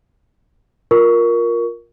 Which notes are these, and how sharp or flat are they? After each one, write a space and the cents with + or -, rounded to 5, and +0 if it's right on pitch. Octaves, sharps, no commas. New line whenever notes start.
F4 +10 A#4 +10 C#6 +20